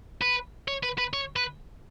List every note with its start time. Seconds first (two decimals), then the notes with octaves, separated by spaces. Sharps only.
0.22 B4
0.68 C#5
0.83 B4
0.98 B4
1.13 C#5
1.36 B4